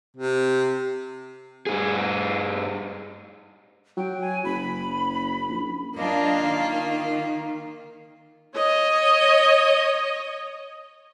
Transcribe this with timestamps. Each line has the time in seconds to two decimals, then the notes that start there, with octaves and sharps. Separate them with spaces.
0.16 C3
1.66 G2 G#4
3.97 F#3 G5
4.21 G#5
4.45 F#1 B5
5.49 A#1
5.96 F#2 A#3 D4 F4 D#5
6.43 D#3
8.56 C#5 D#5